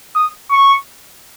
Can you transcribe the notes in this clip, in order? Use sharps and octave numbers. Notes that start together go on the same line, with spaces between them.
D#6
C#6